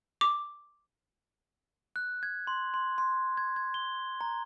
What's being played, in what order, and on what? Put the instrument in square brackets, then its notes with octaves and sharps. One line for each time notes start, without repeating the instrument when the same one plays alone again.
[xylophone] D6
[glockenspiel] F#6
G#6
C6
C6
C6
G#6
G#6
G7
A#5